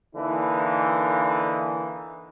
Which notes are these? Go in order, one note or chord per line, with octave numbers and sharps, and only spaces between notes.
D3 E3 A#3 D#4